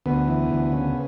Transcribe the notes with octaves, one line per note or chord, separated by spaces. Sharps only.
D2 B3
E3
D2
C#3